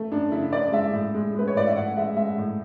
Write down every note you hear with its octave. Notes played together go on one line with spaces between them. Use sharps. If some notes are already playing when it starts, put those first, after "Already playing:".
Already playing: A3
F#2 D4
C#3 E4
F#2 D5
G#3 E5
A2
G#3
G#3 B4
C#5
A2 D5
E5
A2 F#5
G#3 E5
G#3 E5
A2